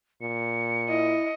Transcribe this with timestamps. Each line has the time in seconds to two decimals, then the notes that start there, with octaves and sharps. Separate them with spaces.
0.21 A#2 C#7
0.90 E4 D#5